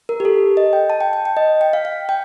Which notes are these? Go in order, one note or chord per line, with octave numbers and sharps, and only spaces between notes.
A#4
G4
A4
D#5
G5
A5
G5
G5
G5
D#5
G5
F5
F5
G5